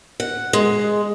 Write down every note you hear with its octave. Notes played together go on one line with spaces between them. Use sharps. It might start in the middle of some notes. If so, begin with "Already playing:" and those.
F#5
G#3